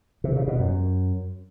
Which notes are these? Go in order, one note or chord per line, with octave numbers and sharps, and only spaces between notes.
C3
C#3
B2
F#2